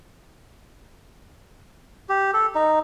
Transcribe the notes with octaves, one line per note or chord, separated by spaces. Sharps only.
G4
A4
D#4